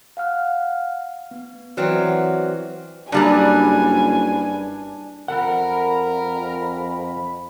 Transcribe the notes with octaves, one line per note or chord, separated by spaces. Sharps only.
F5 F#5 F6
B3
E3 F#3 C4 F#4 D5 F6
F#1 G2 G3 D4 G#5 A#5
F2 A#4 F#5 B5